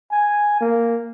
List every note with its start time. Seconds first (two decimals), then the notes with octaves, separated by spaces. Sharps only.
0.12 G#5
0.61 A#3